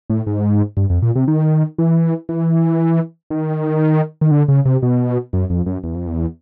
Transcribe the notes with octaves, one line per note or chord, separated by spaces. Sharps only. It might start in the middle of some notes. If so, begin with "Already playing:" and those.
A2
G#2
G2
F2
A#2
C3
D#3
E3
E3
D#3
D#3
D3
C#3
C3
B2
F#2
F2
F#2
E2
F2
E2